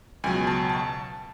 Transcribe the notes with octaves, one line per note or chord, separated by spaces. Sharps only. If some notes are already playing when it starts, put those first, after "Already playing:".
C#2 B2 F#3 G#5
A5
A5